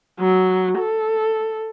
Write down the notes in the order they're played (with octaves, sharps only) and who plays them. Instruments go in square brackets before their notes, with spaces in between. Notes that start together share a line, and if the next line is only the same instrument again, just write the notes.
[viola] F#3
A4